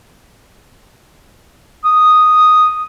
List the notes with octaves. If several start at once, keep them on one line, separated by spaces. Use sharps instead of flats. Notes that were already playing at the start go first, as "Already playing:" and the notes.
D#6